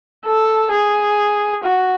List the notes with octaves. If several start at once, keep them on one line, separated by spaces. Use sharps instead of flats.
A4
G#4
F#4